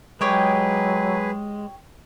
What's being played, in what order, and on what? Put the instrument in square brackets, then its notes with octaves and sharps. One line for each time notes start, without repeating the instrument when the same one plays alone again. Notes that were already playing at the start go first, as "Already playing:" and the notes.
[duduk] F#3 [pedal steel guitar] G#3 [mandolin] G4 C#5 G5 [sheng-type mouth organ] G#4 B4